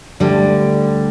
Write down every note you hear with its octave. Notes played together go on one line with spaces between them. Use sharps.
D2 D3 G3